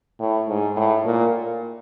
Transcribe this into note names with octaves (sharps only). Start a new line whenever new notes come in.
A2
G#2
A2
A#2